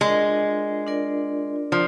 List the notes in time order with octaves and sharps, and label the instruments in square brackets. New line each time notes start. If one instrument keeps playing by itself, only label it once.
[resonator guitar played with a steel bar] G#3 [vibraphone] D4 F4 A#4 D5
[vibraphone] D4 F4 A#4 D5
[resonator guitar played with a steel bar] F3 [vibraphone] D5